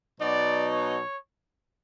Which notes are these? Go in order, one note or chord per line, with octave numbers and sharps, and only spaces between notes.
B2 F#3 B3 D#4 D5
C#5